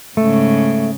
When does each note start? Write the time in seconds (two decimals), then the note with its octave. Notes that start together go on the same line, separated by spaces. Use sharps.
0.17 G#2 C#3 A3